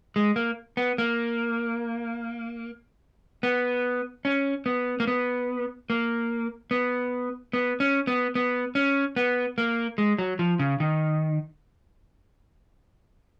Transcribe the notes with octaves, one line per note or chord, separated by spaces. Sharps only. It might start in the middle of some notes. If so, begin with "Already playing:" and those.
G#3
A#3
B3
A#3
B3
C#4
B3
A#3
B3
A#3
B3
B3
C#4
B3
B3
C#4
B3
A#3
G#3
F#3
F3
C#3
D#3